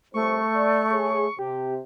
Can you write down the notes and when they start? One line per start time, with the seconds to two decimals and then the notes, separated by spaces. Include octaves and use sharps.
0.14 C2 A2 A3 C5 C#6
0.53 D5
0.91 G#4 C#5
1.39 C3 G4